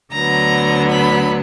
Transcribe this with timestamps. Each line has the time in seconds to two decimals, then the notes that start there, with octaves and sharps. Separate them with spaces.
0.12 D2 D3 F#3 B3 A#5
0.91 B5